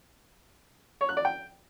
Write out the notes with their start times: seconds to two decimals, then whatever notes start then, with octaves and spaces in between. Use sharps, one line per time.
1.01 C#5
1.09 F#6
1.17 D5
1.25 G5